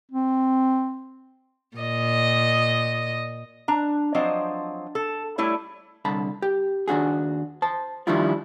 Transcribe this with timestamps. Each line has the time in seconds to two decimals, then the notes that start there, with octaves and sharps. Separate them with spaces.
0.12 C4
1.77 A#2 D#5
3.68 D4 A#5
4.15 F3 F#3 C4 D4 C5 D#5
4.95 A4
5.38 G3 A3 E4 C#5
6.05 C2 D3 A5 B5
6.42 G4
6.88 D#2 D4 F#4 G#4
7.62 C5 A5
8.07 D#3 F3 G3 D4 E4 F4